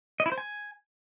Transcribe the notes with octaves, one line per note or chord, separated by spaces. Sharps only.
D#5
E4
C5
G#5